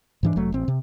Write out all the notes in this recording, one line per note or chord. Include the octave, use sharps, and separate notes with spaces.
G#2 E3 D4
F1 F#3 A3
A1 C4
C3